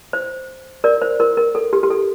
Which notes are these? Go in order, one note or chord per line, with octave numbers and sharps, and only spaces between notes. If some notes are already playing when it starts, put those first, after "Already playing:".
C5
A#4 D5
C5
A#4
A#4
A4
G4
G4
A4